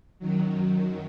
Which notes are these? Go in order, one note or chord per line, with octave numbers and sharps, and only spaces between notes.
F#2 D#3 F#3